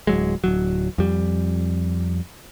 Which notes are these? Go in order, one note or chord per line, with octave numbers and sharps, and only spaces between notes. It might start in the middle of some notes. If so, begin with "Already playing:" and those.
D1 F#3 G#3
D1 F#3
F2 G3